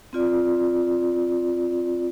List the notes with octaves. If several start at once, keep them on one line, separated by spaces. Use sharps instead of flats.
C4 F4 D5